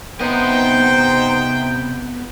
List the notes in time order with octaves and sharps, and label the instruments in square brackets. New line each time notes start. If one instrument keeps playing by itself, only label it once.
[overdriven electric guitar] C3 D#5 [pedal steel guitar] B3 [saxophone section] D#4 C5 [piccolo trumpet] G5